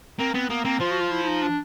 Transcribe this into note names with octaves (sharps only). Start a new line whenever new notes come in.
A#3 C4
B3 C4
A#3 B3
A#3 C4
F3 F4
F#4
F4
E4
E4
D#4
D4